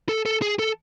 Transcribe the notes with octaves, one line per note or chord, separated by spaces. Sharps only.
A4
A4
G#4
A4